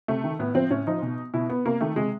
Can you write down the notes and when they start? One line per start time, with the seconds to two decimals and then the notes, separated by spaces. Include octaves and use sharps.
0.08 C3 A3
0.24 D#3
0.39 A2 B3
0.55 F3 C4
0.70 A2 C#4
0.87 F3 D#4
1.02 B2
1.34 B2 E4
1.50 B3
1.65 C3 A#3
1.81 D#3 A3
1.96 C3 G#3